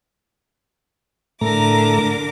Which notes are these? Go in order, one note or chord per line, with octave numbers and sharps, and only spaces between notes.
A2 D3 A3 A#4 A#5 D6